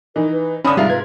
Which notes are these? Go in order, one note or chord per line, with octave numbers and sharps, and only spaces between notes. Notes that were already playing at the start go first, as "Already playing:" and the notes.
E3 D#4 A#4
B4
G2 D3 C#4 D5 B5 D#6
G#2 C3 G3 F4 A#4 E5
B4 G#6